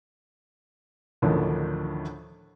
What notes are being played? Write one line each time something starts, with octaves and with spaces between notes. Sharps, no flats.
A1 D2 A2 D3 D#3 F3